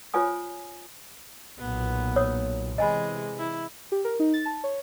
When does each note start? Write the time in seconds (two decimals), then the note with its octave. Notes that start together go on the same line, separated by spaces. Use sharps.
0.14 F4 C5 C#5 G#5 D#6
1.59 B1 A#2 B3
2.16 C#5 D#6 E6
2.78 C3 E3 G#3 D#5 G#5 B5
3.39 E4
3.92 G4
4.04 A#4
4.20 D#4
4.34 A6
4.46 A5
4.64 C#5